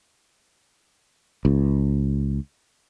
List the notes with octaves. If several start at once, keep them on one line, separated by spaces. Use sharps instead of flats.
C#2